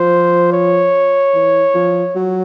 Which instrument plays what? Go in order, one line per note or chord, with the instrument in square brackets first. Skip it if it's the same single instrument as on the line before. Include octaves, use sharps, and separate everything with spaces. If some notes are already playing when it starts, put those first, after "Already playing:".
Already playing: [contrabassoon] F3 [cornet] C5
[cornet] C#5
[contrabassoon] E3
F3
F#3